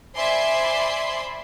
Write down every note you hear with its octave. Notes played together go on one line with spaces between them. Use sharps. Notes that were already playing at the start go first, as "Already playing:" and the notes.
C5 D5 E5 G#5 B5 C6